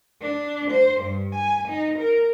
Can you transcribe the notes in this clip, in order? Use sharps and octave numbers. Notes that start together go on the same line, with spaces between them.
D4
C5
G2
G#5
D#4
A#4